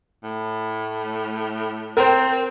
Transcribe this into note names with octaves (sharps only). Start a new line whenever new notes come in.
A2
C4 A#4 C5